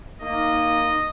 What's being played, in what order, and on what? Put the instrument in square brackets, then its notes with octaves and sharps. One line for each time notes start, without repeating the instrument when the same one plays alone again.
[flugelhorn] A#3 [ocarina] D#4 [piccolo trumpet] D#5